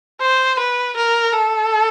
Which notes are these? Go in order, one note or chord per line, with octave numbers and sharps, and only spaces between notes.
C5
B4
A#4
A4